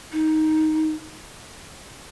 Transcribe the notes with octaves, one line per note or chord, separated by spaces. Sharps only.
D#4